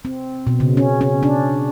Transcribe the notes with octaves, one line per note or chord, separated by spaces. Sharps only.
C4
B2
C#3
C#4
C#4
D4